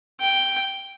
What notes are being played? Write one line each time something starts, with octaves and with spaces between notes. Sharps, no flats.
G5